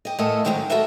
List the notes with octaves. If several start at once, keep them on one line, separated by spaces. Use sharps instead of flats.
G4 D#5
E2 A2 A3 A4 A#4 D#5
G#2 D#3 F#3 A3 C4 C#4
F#4 A4 A#4 D#5 E5